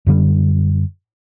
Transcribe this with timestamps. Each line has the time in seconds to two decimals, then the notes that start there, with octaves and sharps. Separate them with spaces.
0.07 F#2 D3 G3